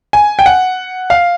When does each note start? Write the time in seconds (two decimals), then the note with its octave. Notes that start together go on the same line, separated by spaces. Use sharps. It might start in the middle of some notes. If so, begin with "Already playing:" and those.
0.13 G#5
0.39 G5
0.46 F#5
1.10 F5